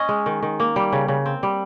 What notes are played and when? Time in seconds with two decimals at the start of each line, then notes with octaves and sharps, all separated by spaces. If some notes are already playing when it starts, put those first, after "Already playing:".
Already playing: C#4 D#5
0.09 G#3
0.26 D#3
0.43 D#3
0.60 A#3
0.76 G3
0.93 C#3
1.08 C#3
1.26 C4
1.43 G3